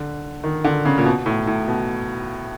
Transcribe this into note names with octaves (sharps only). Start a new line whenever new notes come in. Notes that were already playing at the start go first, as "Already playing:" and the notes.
Already playing: D3
D#3
D3
C#3
A#2
B2
A2
A2
B2